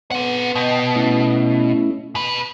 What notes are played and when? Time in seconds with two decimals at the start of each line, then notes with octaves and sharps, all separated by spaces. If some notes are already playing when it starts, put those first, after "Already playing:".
0.11 B3 C4 F#5
0.55 B2 D#5 G5 A5
0.95 A3 C#4 E4
2.15 B2 B4